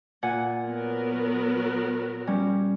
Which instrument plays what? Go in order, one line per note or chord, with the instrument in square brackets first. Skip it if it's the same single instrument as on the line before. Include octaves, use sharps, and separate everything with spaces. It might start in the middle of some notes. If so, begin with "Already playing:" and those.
[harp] A#2 F#5 G#5
[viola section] F#3 B3 A#4
[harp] G3 C#4